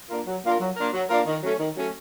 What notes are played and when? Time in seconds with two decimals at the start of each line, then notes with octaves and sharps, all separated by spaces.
0.10 A#3 D4 F4 A#4
0.27 F#3
0.44 A#3 D4 F4 A#4
0.60 F#3
0.76 A#3 D4 F4 A#4
0.94 F#3
1.10 A#3 D4 F4 A#4
1.26 D#3
1.43 F#3 A3 C#4
1.59 D#3
1.76 F#3 A3 C#4